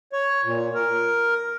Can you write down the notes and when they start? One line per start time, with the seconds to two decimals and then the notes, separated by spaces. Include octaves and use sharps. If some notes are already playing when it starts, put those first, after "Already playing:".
0.13 C#5
0.44 A#2
0.75 A#4